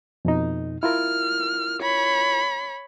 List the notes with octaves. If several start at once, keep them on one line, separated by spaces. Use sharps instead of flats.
F2 B2 D#4
E4 F4 A#4 F6
C#5 B5